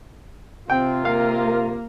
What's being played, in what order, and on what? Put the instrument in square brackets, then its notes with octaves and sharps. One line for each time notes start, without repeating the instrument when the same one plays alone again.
[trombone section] C3 F4 [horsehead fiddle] C4 [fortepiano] G5
[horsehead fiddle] A#3 A#4 [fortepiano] F5